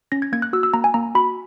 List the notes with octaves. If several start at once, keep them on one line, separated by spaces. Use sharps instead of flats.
C#4 A#6
G#6
A#3 G#6
F#6
F#4 E6
E6
A#3 A#5
G#5
A#3 A#5
F#4 B5